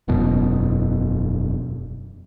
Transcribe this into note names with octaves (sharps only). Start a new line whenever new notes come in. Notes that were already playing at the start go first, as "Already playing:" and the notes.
E1 F#2 B2